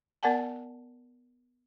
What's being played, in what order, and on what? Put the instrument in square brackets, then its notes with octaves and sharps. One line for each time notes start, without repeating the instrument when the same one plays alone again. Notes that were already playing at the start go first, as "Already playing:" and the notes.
[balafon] B3 A#4 D5 F#5 G#5 A5